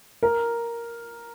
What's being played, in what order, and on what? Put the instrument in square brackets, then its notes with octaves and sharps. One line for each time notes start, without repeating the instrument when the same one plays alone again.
[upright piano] A#4